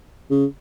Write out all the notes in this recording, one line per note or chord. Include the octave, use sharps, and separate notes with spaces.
C#3